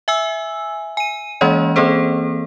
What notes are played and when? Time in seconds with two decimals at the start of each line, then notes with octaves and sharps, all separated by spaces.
0.08 E5 G#5 E6
0.97 G#5 D#7
1.41 E3 G#3 A#3 C#4 C#5 D#5
1.76 E3 A#3 C4 G#4 A4 C5